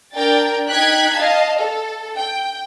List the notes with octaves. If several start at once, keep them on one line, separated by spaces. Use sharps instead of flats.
D4 A#4 G5 A6
D#4 G5 F#6 G#6 B6
D#5 F5 A5
A4
G5